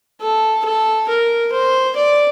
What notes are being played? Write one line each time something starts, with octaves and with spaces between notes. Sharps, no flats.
A4
A4
A#4
C5
D5